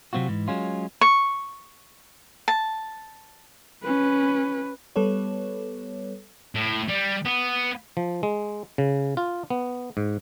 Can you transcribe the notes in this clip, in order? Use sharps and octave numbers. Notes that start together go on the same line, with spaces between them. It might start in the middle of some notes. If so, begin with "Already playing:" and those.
C3 F#3 C4 F4 F#4
G#2 E3
F#3 G#3 C#4 F4
C#6
A5
C#4 B4
G3 B3 A4 B4 C#5
A2
G3
B3
F3
G#3
C#3
F4
B3
G#2